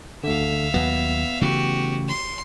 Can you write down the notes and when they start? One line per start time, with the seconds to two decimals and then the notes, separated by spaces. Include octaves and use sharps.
0.24 D2 D3 E5 F5
0.74 D#2 F#3 B3
1.41 C#3 E3 A3 F#4 G4
2.08 C6